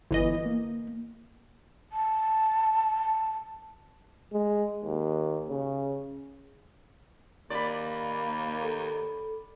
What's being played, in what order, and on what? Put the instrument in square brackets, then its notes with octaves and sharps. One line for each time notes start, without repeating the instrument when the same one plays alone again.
[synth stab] G1 E3 D#5 [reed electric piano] E4
[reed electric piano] A#3
[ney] A5
[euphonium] G#3
D#2
C#3
[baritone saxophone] D#2 [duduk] A#3 [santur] D5 B5
[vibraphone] A4